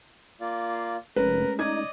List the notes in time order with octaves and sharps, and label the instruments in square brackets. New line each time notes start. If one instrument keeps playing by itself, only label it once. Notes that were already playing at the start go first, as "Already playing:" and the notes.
[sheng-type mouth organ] A#3 F4 D5
[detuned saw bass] F1 [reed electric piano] G#3 A3 C#4 [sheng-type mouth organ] A#4 [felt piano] B4
[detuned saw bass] D#4 [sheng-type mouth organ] D5 D#5 [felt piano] G#6